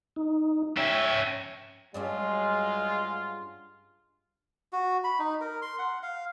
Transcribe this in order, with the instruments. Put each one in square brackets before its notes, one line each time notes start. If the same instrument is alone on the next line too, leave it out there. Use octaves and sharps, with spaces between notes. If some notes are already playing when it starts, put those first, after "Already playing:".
[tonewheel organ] D#4
[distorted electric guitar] C#4 E5 [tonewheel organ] C#5 G5 G#6
[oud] G2 F#3 C#4 [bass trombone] G#3 [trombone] F4
[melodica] F#4
B5
D#4
A#4
C6
F#5
F5